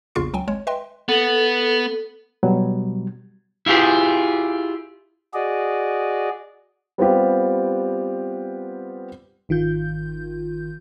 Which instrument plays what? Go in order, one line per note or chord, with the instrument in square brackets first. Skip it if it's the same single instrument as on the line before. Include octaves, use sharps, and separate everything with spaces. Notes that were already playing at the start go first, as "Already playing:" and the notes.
[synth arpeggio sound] A#1 E2 C#3 F4 C#6 C7
C#2 F#3 G5 G#5
G#1 G#3 C#5
B4 D#5 E5 G5 C6
[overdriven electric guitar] B3 [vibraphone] A4
[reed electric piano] B2 F#3 G3
[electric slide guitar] E4 F4 G4 G#4
[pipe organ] F#4 G#4 D5 D#5
[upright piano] G3 B3 C4 F4 G4
[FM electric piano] G#1 D#3 F4 G6